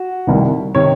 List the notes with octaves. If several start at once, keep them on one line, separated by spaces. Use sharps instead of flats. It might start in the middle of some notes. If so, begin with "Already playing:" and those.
Already playing: F#4
C2 C3 D#3
C3 D#3 C#5